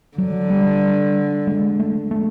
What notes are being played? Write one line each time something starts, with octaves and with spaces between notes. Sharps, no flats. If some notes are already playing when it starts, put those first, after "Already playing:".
D3 F#3
G3
G#3
A3
A3